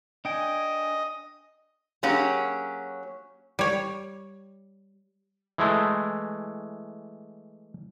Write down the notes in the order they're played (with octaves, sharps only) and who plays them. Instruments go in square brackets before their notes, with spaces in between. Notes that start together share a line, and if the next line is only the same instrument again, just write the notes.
[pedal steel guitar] D4 G5 G#5 [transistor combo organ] D#5
[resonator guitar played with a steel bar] F#3 A#3 C#4 G4 G#4
[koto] G3 C#5
[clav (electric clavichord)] E3 G#3 A3